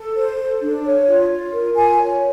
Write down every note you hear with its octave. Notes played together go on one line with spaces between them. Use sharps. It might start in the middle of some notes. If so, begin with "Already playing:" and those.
Already playing: A4
C5
A4
D4
C#5
F4
F4
A#4
F4 G#5
C#5